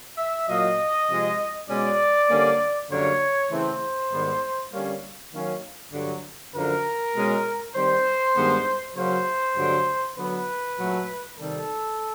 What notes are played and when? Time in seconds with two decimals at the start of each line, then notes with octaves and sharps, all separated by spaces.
0.18 E5
0.48 A#2 F#3 A#3 D#5
1.08 C3 F3 G#3
1.69 B2 G#3 C#4 D5
2.30 D3 G3 A#3 C#4
2.90 F#2 D3 G3 A#3 C#5
3.51 C#3 E3 A3 C4 C5
4.11 G#2 D#3 G3 B3
4.72 D3 G3 A#3 C#4
5.32 D#3 F#3 A#3 C#4
5.93 G2 D3 F#3
6.54 F#2 D3 F3 A#4
7.14 B2 G#3 C#4
7.74 D#3 G3 C4 C5
8.36 G2 D#3 G#3 B3
8.95 C#3 F#3 A#3 C#4 C5
9.57 G2 D3 F#3 A3
10.17 D3 F#3 B3 B4
10.78 A#2 F#3 A3
11.38 C3 D#3 G3 A4